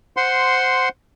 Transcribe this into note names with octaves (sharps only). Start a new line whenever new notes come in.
C5 F#5 C6